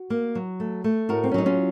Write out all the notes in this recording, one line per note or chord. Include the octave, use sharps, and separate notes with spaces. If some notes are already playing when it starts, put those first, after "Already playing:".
Already playing: F#4
A#3
F#3
A3
A3
A2 F#4 A#4
C4
C#4
F#3 D#4
C#4 F4